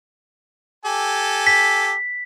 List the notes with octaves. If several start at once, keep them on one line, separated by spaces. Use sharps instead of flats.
G4 A4 G#5
B6